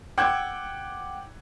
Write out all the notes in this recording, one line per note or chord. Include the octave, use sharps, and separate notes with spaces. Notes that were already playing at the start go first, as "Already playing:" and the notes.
F#5 G5 D6 E6 G6 G#6